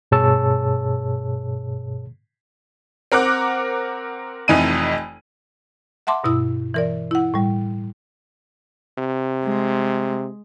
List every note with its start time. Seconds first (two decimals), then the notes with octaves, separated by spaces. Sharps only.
0.11 G2 B2 G#4 C#5 A5 E6
3.12 C4 A#4 F#5 D6 F#6
4.48 F1 F2 E3 D#4 D#7
6.07 E5 F#5 A5 C6 D6
6.24 G2 B2 E4 E6
6.74 E3 A#4 D5
7.11 E4 F#5
7.34 A2 G3
8.98 C3
9.44 G#3